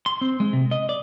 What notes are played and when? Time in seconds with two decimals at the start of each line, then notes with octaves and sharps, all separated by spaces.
0.06 C6
0.21 C4
0.40 G#3
0.53 C3
0.71 D#5
0.89 D5